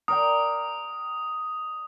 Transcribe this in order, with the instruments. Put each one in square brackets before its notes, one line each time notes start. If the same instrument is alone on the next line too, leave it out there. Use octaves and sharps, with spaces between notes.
[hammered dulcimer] A#4 D5 G5 [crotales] D#6